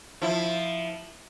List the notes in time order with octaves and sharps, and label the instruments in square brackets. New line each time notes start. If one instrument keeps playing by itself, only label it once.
[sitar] F3 E4